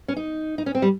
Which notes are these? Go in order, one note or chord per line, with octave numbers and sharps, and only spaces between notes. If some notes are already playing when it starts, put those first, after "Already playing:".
C#4
D#4
D#4
C#4
C4
G3